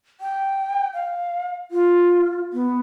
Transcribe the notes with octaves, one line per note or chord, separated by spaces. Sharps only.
G5
F5
F4
B3